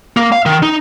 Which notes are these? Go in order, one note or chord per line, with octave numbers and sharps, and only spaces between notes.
A#3
F5
D#3
D#4